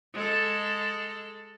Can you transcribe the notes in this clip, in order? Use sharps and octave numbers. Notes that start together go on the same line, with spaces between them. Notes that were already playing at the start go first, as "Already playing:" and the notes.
G#3 A4